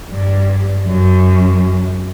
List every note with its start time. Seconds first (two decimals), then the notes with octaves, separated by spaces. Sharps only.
0.10 G2
0.86 F#2